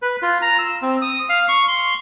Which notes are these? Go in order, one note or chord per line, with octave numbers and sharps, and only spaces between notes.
B4
F4
A#5
E6
C4
D#6
F5
C#6
C6